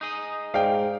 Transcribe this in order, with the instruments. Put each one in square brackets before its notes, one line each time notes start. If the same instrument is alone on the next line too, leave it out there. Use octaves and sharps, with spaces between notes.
[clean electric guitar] D#4 G#4 D#5
[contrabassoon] G#2 [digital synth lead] D5 [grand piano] F5 G5